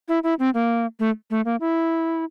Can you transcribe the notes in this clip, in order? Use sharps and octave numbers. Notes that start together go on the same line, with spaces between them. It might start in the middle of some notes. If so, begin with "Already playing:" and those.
E4
E4
C4
A#3
A3
A3
A#3
E4